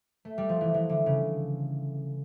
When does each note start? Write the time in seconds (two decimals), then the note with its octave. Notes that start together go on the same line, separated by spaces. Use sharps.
0.25 A3
0.38 G3
0.49 F3
0.61 E3
0.74 E3
0.89 D3
1.06 C#3